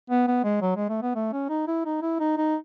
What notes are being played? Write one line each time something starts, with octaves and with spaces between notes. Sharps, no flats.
B3
B3
G#3
F#3
G#3
A3
B3
A3
C#4
D#4
E4
D#4
E4
D#4
D#4